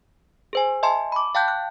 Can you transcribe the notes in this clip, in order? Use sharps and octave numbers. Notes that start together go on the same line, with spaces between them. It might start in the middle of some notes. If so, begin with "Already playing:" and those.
G#4 C5 G#5
D#5 E5 G#5 A5 C6
B5 D6
F5 G5 A5 F#6 G6
F#6